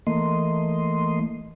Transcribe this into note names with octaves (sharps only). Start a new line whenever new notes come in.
E3 A3 A#3 D#5 C6